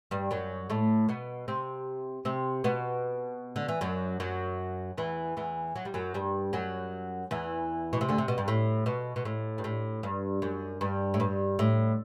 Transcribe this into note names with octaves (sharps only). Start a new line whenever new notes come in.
G2 G3
F#2 F#3
A2 A3
B2 B3
C3 C4
C3 C4
B2 B3
D3
E3
F#2 F#3
F#2 F#3
E2 E3
E2 E3
F#3
G3
F#2 F#3
G2 G3
F#2 F#3
E2 E3
B2
C3
D2 D3
C3
B2
G2
A2
B2
B2
A2
G2
A2
G2
F#2
G2
A2
G2
A2